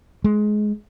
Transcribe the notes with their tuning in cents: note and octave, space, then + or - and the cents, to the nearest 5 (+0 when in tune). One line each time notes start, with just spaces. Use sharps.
G#3 +20